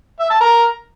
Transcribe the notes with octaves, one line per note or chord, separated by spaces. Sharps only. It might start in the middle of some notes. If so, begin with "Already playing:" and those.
E5
A5
A#4